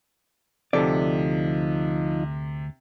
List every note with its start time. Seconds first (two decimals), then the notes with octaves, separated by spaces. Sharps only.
0.73 D2 C3 F3 D#4 A4 D5